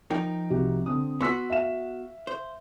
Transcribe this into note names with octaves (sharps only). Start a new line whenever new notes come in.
F3 D#4 A#4 G5
C2 F#4 G4
D3 C4 D#6
B3 F#4 C6 E6 B6
E5 F5 E7
C5